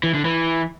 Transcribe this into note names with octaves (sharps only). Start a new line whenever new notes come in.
E3
D3
E3